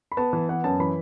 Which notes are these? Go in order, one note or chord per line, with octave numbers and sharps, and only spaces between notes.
B5
B3 A5
E3
B3 F#5
F#2 A5
E3 B5